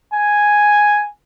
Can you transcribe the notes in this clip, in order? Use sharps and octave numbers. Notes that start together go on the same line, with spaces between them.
G#5